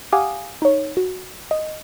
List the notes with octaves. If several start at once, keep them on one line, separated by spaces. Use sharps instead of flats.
G4 F5 F#5 G#5 D6 D#6
D#4 C#5
F#4
D#5